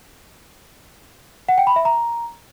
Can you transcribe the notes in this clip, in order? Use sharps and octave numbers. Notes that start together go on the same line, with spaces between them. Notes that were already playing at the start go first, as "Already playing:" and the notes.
F#5
G5
B5
E5
A#5